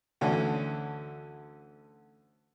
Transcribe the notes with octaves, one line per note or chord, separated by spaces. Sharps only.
D2 D3 E3 C#4